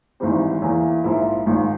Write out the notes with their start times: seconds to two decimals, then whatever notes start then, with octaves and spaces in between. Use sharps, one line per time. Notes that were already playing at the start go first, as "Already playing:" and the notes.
0.20 G#1 G#2 E3 G3 C4
0.62 E2 E3 A#3
1.04 A#1 G#2 F3 A#3 E4
1.46 G#1 G#2 F3